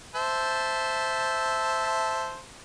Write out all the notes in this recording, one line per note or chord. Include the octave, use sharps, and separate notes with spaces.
C5 E5 A5